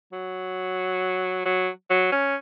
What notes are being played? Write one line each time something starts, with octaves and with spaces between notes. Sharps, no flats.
F#3
F#3
F#3
C#4